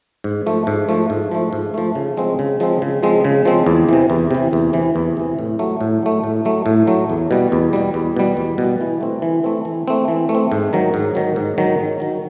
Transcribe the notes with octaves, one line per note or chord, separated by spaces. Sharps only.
G#2
F3 A3
G#2
F3 A3
G#2
F3 A3
G#2
F3 A3
C#3
F3 G#3 C4
C#3
F3 G#3 C4
C#3
F3 G#3 C4
C#3
F3 G#3 C4
E2
C3 E3
E2
C3 E3
E2
C3 E3
E2
C3 E3
A2
F#3 A3
A2
F#3 A3
A2
F#3 A3
A2
F#3 A3
E2
B2 G3
E2
B2 G3
E2
B2 G3
E2
B2
G3
E3
A3 C4
E3
A3 C4
E3
A3 C4
E3
A3
C4
G#2
D#3 F#3
G#2
D#3 F#3
G#2
D#3 F#3
G#2
D#3 F#3